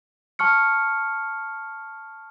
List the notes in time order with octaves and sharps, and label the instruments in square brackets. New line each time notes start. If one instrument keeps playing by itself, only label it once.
[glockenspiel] A5 C#6 F6 C#7